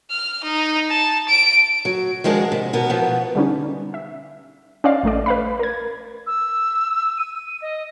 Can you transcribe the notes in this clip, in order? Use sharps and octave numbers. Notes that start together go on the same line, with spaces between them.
F6
D#4
A5
D7
F#3
D#3 F3 G#3 D4 F#4 A#4
C3
B2 B3 A#4
B2 E3 F3 B3
D3 G3 B3 C#4 D#4
E5
C#4 C5 D5 D#5 F5
A1 A3 A4 D5
B4 F5 B5
A#4 G#6
E6
D#7
D#5